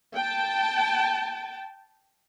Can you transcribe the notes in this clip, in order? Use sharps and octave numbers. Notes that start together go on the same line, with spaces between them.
G5 A5